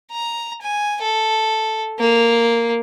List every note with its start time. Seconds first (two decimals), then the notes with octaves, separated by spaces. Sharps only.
0.12 A#5
0.62 G#5
1.02 A4
1.99 A#3